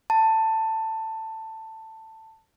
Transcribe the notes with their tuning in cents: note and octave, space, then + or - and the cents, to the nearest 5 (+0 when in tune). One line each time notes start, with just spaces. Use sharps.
A5 +15